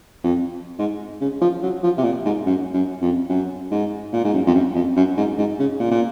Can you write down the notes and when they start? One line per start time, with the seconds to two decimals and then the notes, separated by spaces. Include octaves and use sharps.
0.24 F2
0.79 G#2
1.21 C#3
1.42 F3
1.63 F#3
1.83 F3
1.98 C3
2.04 A#2
2.25 G#2
2.46 F#2
2.74 F#2
3.02 F2
3.30 F#2
3.71 G#2
4.13 A#2
4.24 G#2
4.34 F#2
4.47 F2
4.55 F#2
4.76 F2
4.96 F#2
5.17 G#2
5.38 G#2
5.59 C#3
5.80 A#2
5.91 A#2